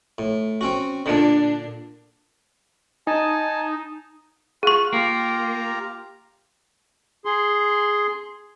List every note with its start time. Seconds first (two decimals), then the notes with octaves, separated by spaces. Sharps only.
0.18 A2
0.61 C4 C#4 F#4
1.06 A#2 D3 D4
3.07 D#4 G#5 A5
4.63 F4 G#4 F#5 C#6
4.93 A#3 F4 G4 A#5
7.25 G#4 C6